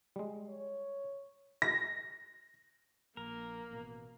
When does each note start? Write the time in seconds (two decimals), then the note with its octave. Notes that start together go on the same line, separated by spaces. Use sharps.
0.16 G3 G#3
0.49 C#5
1.62 A#6
3.17 A#1 A#3 A#4
3.71 A1 B2